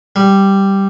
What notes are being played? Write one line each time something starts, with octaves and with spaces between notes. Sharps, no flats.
G3